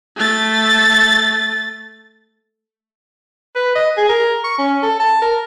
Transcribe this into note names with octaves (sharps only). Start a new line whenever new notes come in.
A3 A6
B4
D#5
G#4
A#4
C#6
C#4
A4
A5
A#4